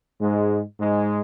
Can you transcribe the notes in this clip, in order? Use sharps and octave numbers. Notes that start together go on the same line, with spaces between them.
G#2 G#3
G#2 G#3